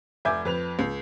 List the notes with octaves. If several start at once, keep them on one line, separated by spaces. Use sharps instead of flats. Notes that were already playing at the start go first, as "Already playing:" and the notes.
F1 E5 G#5 D6 G6 G#6
F2 B4 F7
C#2